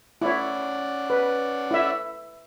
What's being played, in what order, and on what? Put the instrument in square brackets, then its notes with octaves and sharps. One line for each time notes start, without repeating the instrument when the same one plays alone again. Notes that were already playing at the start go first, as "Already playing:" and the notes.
[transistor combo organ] C#4 D5 F#5 [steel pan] E4 C#5
[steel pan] B4
E4 E5